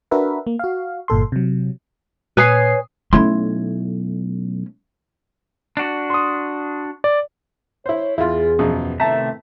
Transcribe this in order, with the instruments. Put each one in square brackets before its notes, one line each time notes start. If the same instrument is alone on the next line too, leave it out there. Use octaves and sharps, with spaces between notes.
[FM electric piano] D4 F#4 A#4 B4 E5
A#3
F#4 F5
G1 A#2 A4 C6
C3 F#3
[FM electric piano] A#2 D#6 C7 [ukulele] B4 C#5 G#5
[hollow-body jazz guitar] B1 E4 C6 [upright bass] A3 C#4
[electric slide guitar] D4 F#4
[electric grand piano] C6 D#6
D5
[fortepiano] E4 C5 [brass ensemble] C#5
[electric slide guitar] E2 [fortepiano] E4 F4 [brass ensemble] G#4
[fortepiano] F#2 B2 F3
[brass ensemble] A2 D#3 B3 [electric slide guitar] C3 A3 E5 [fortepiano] A5 A#5